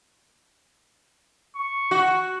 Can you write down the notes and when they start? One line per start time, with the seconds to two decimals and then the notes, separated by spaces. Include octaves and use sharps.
1.55 C#6
1.91 F#4